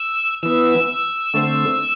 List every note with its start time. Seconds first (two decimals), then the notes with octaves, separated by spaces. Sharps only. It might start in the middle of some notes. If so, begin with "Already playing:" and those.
Already playing: E6
0.43 E3 B3 E6
1.34 D3 A3 C4